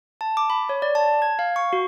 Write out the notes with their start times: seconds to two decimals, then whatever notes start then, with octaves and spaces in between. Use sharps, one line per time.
0.21 A5
0.37 D6
0.50 B5
0.69 C#5
0.82 D5
0.95 A5
1.22 G#6
1.39 F5
1.56 C#6
1.73 F#4